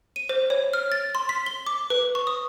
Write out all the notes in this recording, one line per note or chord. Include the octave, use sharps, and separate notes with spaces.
D#7
C5
C#5
F6
A6
C6
B6
G7
D6
B4
C#6
D#6